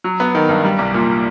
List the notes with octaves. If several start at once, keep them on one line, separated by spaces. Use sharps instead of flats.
F#3
B3
D#3
G2
G3
C2
A#2